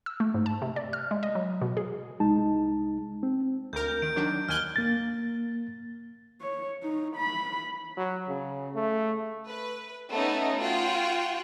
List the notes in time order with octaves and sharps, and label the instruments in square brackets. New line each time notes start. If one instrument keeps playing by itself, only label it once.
[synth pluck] E6
A3
G#2
A5
C3
D5
F6
G#3
D#5
F#3
B2
G#4
[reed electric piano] C2 G#3 D#4 A5
C4
[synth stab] D2 A#4 [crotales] G6
[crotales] G6
[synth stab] D#3 [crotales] D7
[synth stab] D#3 F#3 D4
[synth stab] D#2 G#5 F#6 [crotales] F6 G7
[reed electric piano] A#3 A6
[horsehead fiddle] C#5
D#4
B5
[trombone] F#3
C#3
A3
[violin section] B4
A3 B3 C#4 D#4
F4 F#4 G5